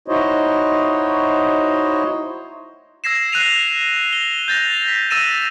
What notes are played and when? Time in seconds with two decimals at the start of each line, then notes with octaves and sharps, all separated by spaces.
0.08 D#4 E4 F#4 C5 C#5 D#5
3.04 E6 G#6 A#6 C7 E7
3.32 F#6 C7 D#7 F7
4.13 G7
4.48 G6 A6 A#6 F7
4.88 B6
5.10 E6 A6 A#6 D#7 E7